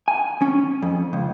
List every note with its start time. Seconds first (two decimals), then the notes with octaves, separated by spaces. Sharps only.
0.08 G#5
0.42 C#4
0.82 F2
1.13 C#2